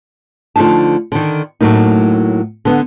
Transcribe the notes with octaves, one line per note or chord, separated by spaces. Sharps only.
D3 F3 A3 D#4 A5
D3 D#3
A2 F#3 A3 A#3 D#4
D3 B3